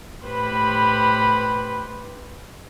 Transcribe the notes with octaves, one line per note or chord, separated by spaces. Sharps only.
A2 G4 B4 C5 B5